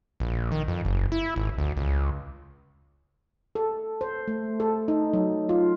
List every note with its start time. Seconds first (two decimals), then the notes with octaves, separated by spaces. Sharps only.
0.20 A#1
0.52 D#3
0.68 F2
0.85 F#1
1.12 E4
1.36 G#1
1.58 D2
1.77 C#2
3.55 A4
4.01 C5
4.28 A3
4.60 A4
4.88 D#4
5.13 F#3
5.49 F4